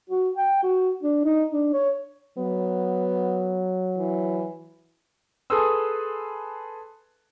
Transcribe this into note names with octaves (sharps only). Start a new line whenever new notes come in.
F#4
G5
F#4
D4
D#4
D4
C#5
F#3 B3
E3
G#4 A4 B4 C6 D#6 E6